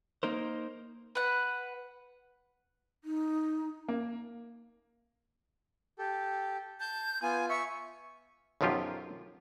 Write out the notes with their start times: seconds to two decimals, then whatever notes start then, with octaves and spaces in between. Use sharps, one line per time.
0.23 A#3 D#4 A#4 C5
1.15 B4 F#5
3.04 D#4
3.88 A#3
5.99 G4 A4
6.80 A5 G6
7.22 B3 F4 G#5
7.49 E5 C#6
8.61 B1 F#2 F3 F#3 F4 G4